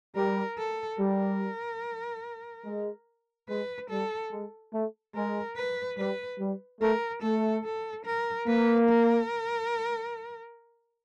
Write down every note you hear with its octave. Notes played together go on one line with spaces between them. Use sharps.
G3 A#4
A4
G3 A#4
G#3
G#3 B4
G3 A4
G#3
A3
G#3 A#4
B4
G3 B4
G3
A3 A#4
A3 A4
A4
A#4
A#3 B4
A#4